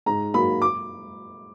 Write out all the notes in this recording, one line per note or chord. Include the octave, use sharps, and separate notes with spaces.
G#2 A#5
F#3 A#3 B5
D6